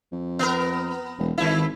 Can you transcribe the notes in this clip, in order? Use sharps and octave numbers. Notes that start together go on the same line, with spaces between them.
F2
B3 A#4
E1
G#1 D#3 E4